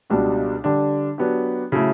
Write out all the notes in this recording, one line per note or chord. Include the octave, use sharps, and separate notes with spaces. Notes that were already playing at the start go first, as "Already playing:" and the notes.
C#2 B2 G3 D4 F#4
D3 G3 D4
F#3 B3 D4 G4
C#3 F#3 A3 E4